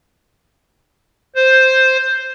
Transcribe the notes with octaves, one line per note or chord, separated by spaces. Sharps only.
C5